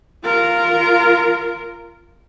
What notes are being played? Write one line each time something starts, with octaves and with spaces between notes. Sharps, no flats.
F4 A#4